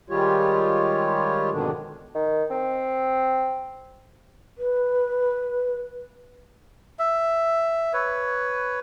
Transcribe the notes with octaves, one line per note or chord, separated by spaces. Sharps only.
D#3 G3 G#3 F4 G4 C#5
F2 G#2 B2 D3 D#3 D4
D#3
C4
B4
E5
B4 C#5